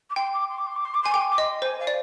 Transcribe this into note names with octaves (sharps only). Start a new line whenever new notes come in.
D6
G5 C6
D6
C6
D6
C6
D6
C6
D6
G#5 C6
G5 D6
C6
D6
D#5 C6
C5 G#5
F5
D5